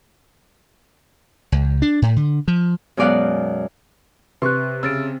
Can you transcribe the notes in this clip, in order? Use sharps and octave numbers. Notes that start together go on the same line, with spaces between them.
C#2
D4
A2
D3
F3
F#2 B2 G#3 D5 F5 F#5
C3 B4 C6 C#6 F#6
C#3 E6 A6 D7